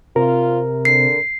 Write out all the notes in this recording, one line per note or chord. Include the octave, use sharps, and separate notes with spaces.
C3 F4 A#4
D3 C7